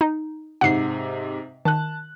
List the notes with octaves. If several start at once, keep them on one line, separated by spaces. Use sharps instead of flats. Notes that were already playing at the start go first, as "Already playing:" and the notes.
D#4
G#2 C3 F#5 C7
D#3 A5 F#6